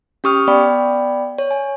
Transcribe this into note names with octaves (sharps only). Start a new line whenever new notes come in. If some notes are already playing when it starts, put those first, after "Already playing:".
C#4 G4 C#6 D#6 F6
B3 D5 G5 B5
C#5
G#5